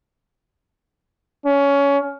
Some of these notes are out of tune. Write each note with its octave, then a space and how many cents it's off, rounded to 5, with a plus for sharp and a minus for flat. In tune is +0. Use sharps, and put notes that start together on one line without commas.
C#4 +20